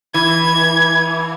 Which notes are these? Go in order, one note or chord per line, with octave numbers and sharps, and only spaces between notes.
E3 G#6